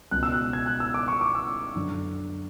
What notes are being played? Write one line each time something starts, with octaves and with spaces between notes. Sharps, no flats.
C#2 B2 F#6
E6
F#6
G#6
F#6
E6
D6
C#6
D6
E6
F#2 D3